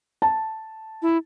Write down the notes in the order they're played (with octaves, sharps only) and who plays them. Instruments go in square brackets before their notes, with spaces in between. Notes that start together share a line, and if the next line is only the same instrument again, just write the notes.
[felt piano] A5
[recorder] E4